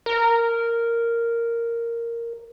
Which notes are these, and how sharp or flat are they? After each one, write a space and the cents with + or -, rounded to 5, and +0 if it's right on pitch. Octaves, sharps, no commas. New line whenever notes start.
A#4 -5